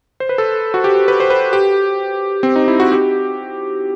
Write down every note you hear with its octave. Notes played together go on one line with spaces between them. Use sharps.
C5
B4
A4
F#4
G4
B4
C5
B4
G4
C4
D#4
E4
F#4
G4